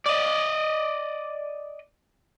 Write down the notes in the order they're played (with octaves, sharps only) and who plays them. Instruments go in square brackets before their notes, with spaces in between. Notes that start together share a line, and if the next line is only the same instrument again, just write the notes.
[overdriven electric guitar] D5 D#5